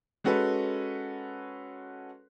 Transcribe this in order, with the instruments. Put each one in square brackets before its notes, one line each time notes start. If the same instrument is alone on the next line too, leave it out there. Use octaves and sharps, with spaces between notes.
[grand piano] G#3 C#4 F#4 A4 B4